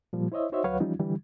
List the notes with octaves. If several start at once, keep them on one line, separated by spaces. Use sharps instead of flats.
A#2 F3 G3
E4 C5 C#5 D#5 E5
D#4 F#4 C5 C#5 D#5 E5
D2 F#3 B4 C#5 F5 F#5
E3 F3 G3 C#4 D#4 F4
D3 E3 G3